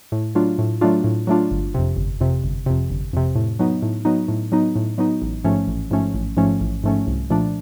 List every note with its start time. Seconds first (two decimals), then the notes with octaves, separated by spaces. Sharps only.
0.12 A2
0.35 F#3 A3 D4 F4
0.59 A2
0.81 F#3 A3 D4 F4
1.04 A2
1.27 F#3 A3 D4 F4
1.51 G1
1.75 F2 C3
1.97 G1
2.20 F2 C3
2.44 G1
2.66 F2 C3
2.90 G1
3.13 F2 C3
3.35 A2
3.59 F#3 B3 D#4
3.82 A2
4.05 F#3 B3 D#4
4.28 A2
4.52 F#3 B3 D#4
4.76 A2
4.98 F#3 B3 D#4
5.22 A1
5.44 G#2 F3 A3 C#4
5.68 A1
5.91 G#2 F3 A3 C#4
6.14 A1
6.37 G#2 F3 A3 C#4
6.61 A1
6.84 G#2 F3 A3 C#4
7.07 C2
7.30 A#2 F3 A3 D4